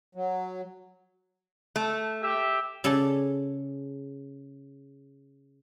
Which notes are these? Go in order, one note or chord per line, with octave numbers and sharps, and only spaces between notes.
F#3
A3
G4 E5
C#3 A4 D5 G#5 A5